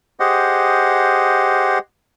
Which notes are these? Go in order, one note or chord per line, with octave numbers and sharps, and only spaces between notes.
G4 G#4 C5 D#5 F#5